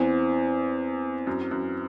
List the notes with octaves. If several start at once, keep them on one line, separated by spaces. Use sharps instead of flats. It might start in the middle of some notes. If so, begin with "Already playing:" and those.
Already playing: E2 C4 E4 C5
F#2
F#2